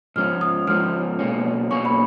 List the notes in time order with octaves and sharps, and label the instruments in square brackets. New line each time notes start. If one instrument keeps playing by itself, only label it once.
[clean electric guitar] G#2 F3 G#3 C#4 [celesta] F6
[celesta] D#6
[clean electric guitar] G#2 F3 G#3 C#4 [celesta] F6
[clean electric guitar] B1 B2 A#3 C#4
[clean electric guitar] B1 B2 A#3 C#4 [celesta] C#6
[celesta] B5